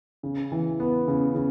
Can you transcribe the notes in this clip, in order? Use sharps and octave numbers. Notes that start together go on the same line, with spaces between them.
C#3
E3
B3
C#3
C#3